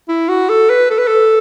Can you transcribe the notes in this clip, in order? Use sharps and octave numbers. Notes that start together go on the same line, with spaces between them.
E4
F#4
A4
B4
A4
B4
A4